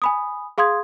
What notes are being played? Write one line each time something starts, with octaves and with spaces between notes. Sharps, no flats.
G#5 B5 D#6
G#4 F5 C6 D#6 G#6